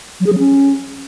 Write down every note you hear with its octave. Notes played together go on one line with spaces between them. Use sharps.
F#3
G#4
F#3
C#4